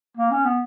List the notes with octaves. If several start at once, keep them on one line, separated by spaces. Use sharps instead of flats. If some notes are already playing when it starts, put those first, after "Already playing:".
A#3
C#4
B3